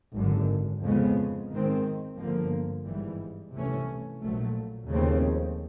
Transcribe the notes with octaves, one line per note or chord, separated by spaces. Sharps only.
G#1 F#2 D3
F2 C#3 F3 G#3 B3
G#2 D#3 G#3 C4
G1 G2 D3 F3 A#3
G#1 G#2 E3 G3
C2 C3 E3 A3 C#4
A#1 A#2 F#3 A3
D#2 C#3 F3 A3 C4